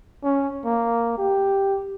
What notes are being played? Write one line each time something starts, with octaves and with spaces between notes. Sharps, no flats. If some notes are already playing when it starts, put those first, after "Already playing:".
C#4
A#3
G4